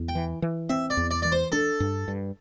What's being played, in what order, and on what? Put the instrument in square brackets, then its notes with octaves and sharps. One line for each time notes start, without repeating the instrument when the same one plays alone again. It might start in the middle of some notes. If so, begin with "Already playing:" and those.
Already playing: [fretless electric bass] E2
[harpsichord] G5
[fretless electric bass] E3
E3
[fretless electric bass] C4 [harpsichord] E5
[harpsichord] D5
[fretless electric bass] E2
[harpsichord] D5
[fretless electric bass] E3 [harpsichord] D5
[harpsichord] C5
[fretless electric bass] D4 [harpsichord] A4
[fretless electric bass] G2
G2